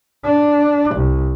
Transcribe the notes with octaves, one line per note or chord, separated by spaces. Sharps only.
D4
C2